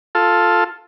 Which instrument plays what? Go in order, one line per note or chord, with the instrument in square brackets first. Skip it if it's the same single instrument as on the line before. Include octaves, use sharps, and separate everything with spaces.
[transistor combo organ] F4 A4